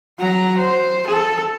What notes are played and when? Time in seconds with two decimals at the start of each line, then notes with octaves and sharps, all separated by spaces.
0.19 F#3 A#5
0.58 C5
1.07 A4